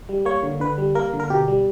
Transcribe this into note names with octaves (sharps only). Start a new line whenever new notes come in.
G3
A#3 C#5
D3
D3 B4
G3
A#3 A#4
D3
A#4
B2 G4
G3